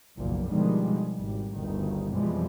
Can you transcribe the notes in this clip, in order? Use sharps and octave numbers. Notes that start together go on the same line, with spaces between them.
F#1 B1 E2 A#2 F3
B2 D3 D#3 F3 G3 G#3
G#1 G3
G1 D2 D#3
F2 B2 E3 F3 G3 G#3